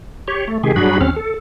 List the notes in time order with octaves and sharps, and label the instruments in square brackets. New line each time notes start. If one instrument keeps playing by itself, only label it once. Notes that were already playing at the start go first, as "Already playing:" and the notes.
[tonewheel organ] G4 C#5
A3
C3 D#3 G#3 G4 G#4
G2 F#3 D4 F#4 G#4 B5
D#2 C4 C#4 F6
A4